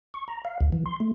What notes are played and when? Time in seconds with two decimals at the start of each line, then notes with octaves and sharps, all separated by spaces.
0.14 C#6
0.28 A#5
0.45 F5
0.61 D2
0.72 E3
0.86 C6
1.00 A3